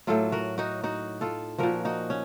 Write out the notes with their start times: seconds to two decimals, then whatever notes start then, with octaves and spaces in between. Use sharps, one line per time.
0.07 A2 F#3 F4 A4
0.32 F#4 A#4
0.58 D#4 F#4
0.83 D#4 F#4
1.21 F4 A4
1.58 A#2 F3 F#4 A#4
1.85 D#4 F#4
2.10 C#4